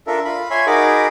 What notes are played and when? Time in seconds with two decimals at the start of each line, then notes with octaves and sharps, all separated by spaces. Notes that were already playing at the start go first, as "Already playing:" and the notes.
0.07 D4 F4 A4 A#4 E5
0.25 F4 B5
0.50 C#5 E5 G#5 B5 C6
0.67 D#4 F#4 G#4 A#4 B5 D6